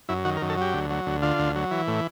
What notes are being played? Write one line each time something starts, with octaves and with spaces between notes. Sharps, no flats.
F#2 E4
D#3 F#4
A#4
F#2
A4
F#3 G4
D2
F#3
D2
D3 F4
D2
F#3
E3
A2